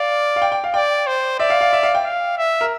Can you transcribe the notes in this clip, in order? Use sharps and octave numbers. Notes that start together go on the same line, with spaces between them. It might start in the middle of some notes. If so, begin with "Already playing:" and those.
Already playing: D5 F5
F5
G5
G5
F5
D5 G5
C5
D5 E5
F5
F5
E5
F5
G5
F5
E5
A#4